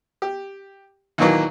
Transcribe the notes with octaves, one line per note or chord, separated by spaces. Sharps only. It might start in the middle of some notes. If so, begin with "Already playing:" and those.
G4
D#2 A#2 E3 F#3 A#3